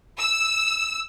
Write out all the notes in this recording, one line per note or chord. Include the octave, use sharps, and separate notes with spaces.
E6